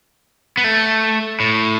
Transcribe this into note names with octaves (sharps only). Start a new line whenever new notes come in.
B3
A3
A2